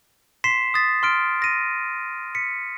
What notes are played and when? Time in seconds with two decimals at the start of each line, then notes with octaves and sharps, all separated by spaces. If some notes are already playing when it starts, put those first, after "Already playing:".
0.44 C6 B6 C7 E7
0.74 D#6 A6 B6
1.03 C6 F6 D7
1.42 A#6 D#7
2.35 B6 C#7